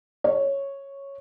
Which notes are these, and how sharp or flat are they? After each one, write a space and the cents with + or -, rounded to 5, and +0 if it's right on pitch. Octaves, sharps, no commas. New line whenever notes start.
C#5 -5